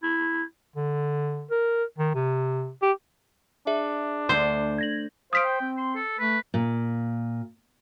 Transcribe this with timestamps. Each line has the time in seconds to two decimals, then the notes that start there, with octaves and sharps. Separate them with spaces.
0.03 E4
0.76 D3
1.51 A#4
1.98 D#3
2.15 C3
2.82 G4
3.67 D4 G#4 E5
4.29 D2 C5
4.78 G#6 A#6 F#7
5.33 C5 F5 D#6 B6 D7
5.44 G5
5.61 C4
5.77 C6
5.95 A4
6.19 A3 B4
6.54 A#2